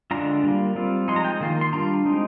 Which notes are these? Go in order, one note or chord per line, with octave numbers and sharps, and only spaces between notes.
D3 G#3 D4 F4 A#5
G3 A#3 F4
G3 C4 F4
F3 G#3 D#4 C6
A#5
G5
D#3 A#3 F4
C6
G3 D4 F4 A#5
G#3 C4 D#4